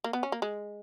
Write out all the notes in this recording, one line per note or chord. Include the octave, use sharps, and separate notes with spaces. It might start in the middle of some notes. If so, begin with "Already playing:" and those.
A#3
B3
C#4
A#3
G#3